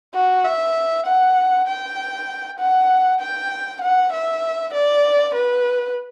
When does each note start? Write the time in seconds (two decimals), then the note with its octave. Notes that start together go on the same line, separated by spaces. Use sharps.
0.14 F#4
0.45 E5
1.06 F#5
1.67 G5
2.59 F#5
3.21 G5
3.82 F#5
4.13 E5
4.74 D5
5.35 B4